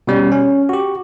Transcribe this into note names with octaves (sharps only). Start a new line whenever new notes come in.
B2 G3 C#4
C#4
F#4 G4